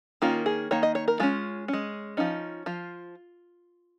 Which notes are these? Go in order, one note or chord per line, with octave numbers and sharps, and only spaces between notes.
D#3 A#3 C#4 F4
G#4
D#3 A#3 C#5
D#5
C#5
A#4
G#3 C#4 F4
C#4
G#3
F3 C#4 D#4
F3 F4